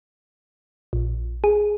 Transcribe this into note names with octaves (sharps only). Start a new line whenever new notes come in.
A#1
G#4